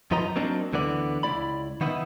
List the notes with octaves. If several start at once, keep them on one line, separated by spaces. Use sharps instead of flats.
F#2 F3 D#4 B4 D#5 A#5
F#3 A#3 C4 D4 D#4
D2 D3 E3 B3 D5
C#2 E4 D5 B5
D#3 B3 D#4 E4